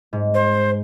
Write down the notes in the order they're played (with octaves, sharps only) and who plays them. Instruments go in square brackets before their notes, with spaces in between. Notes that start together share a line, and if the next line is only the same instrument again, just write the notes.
[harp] G#2
[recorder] C5